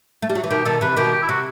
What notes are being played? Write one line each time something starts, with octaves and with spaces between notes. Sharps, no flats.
A3
G3
F#3
E3
B2 D#3 G4
B2 D#3 A4
C3 E3 B4
B2 D#3 G4
G4
E4
C3 F#4